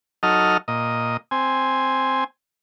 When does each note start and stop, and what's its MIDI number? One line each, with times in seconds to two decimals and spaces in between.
0.23 0.57 54
0.23 0.57 63
0.23 0.57 69
0.23 0.57 75
0.23 0.57 89
0.68 1.17 46
0.68 1.17 75
1.31 2.24 60
1.31 2.24 80